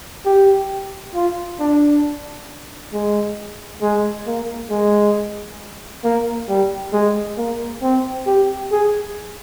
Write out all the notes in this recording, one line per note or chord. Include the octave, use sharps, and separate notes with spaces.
G4
F4
D4
G#3
G#3
A#3
G#3
A#3
G3
G#3
A#3
C4
G4
G#4